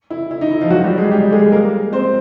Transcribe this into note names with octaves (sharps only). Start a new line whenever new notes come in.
E4
E4
D#4
E4
F3 F4
F#3 F#4
G3 G4
G#3 G#4
G3 G4
G#3 G#4
A#3 A#4
C4 C5